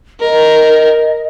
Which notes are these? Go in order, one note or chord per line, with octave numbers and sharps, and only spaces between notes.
A#4 D#5